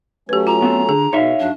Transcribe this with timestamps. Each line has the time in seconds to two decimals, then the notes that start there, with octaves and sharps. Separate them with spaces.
0.29 F#3 A3 C#4 G4 B4
0.47 F4 A#5
0.62 B3 C4 A4
0.89 D3 G#4
1.13 B2 D#4 C#5 E5 F5
1.40 G2 F#3 D4